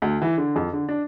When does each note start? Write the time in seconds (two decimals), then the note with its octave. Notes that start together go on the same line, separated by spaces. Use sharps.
0.02 D2
0.22 E3
0.38 D3
0.56 F2
0.73 D3
0.89 D4